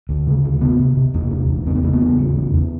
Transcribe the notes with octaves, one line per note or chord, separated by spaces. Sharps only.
D2
C#3
D2
C3 B3
C3
C3
E2 A#3
C3
E2
C#3 C4
B3
C#3 A#3
B3
E2
C#3
E2
E2